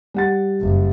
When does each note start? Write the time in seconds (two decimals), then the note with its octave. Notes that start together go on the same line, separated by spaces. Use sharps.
0.14 G3 F#5 A6
0.61 F#1